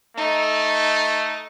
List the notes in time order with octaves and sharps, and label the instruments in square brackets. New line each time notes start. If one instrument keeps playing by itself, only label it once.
[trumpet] A3 [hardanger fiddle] D#4